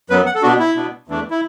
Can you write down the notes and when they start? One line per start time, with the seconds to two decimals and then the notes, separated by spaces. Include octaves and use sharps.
0.10 F#2 F#3 B3 B4
0.26 F#5
0.35 A4
0.42 B2 B3 D4 F#4
0.59 E4
0.75 B2 B3 D4
1.08 E2 E3 A3 D4
1.30 E4